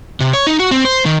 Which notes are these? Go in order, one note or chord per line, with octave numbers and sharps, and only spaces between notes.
C3
C#5
D#4
F#4
C4
C5
D#3